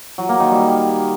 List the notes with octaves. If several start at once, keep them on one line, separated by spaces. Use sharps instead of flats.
F#3
A#3
D#3
G3